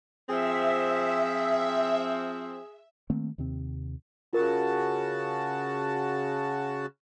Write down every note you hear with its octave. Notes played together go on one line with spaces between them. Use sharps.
F3 C4 G#4 E5
D#3 A3 A#3 C4
D#2 C3 C4
C#3 F4 F#4 A#4 A5